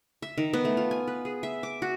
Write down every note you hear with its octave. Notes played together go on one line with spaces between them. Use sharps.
E5
D#3
B3
A3
F4
G#5
B4
G#4
E5
D6
F#4